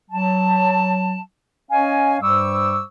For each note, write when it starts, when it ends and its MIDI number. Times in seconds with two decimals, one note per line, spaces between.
0.10 1.18 54
0.10 1.18 81
1.70 2.17 61
1.70 2.17 73
1.70 2.17 75
1.70 2.17 77
1.70 2.17 80
2.21 2.82 43
2.21 2.82 55
2.21 2.82 72
2.21 2.82 85
2.21 2.82 86
2.21 2.82 88